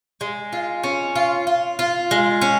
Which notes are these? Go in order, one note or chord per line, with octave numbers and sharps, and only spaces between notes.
G#3
F4
C#4
F4
F4
F4
G#3
C#4